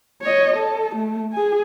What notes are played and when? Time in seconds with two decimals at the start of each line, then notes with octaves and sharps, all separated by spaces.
0.22 C#5 D#5
0.56 A4
0.95 A3
1.33 G#4 G#5